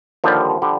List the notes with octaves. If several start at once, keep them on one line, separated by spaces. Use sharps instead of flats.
D#2 D3 F3 G3 F4
D3 G3